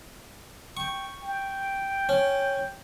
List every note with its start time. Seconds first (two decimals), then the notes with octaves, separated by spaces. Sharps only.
0.77 G5 C#6
1.23 G5
2.09 C#4